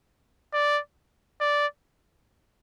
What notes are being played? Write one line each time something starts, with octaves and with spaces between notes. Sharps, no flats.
D5
D5